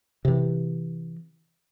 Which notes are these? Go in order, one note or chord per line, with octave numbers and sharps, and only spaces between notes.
C3 E3